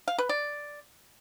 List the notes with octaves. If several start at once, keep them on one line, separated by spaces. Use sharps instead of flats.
F5
B4
D5